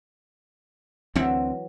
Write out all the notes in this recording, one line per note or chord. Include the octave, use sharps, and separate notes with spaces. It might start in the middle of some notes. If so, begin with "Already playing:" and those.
D2 E3 F#3 C4 E5